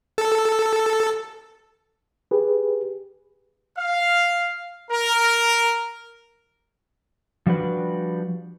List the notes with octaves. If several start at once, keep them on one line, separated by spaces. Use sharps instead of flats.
A4
G4 G#4 B4
F5
A#4
F3 G3 D4 F#4 G4 B4